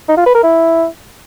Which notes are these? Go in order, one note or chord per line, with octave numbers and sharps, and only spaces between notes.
D#4
F4
B4
A#4
E4